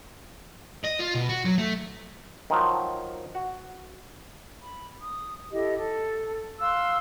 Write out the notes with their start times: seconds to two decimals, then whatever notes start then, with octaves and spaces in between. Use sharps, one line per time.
0.85 D#5
1.00 F4
1.15 B2
1.29 F#4
1.45 F#3
1.58 A3
2.50 D#3 F3 F#3
3.35 F#4
4.61 B5
5.02 D#6
5.51 E4 G4 A4 D#5
5.76 A4
6.61 F5 C6 E6 F#6